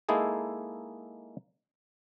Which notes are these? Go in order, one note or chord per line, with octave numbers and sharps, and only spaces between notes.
G#3 A#3 D#4 E4 G#4 A4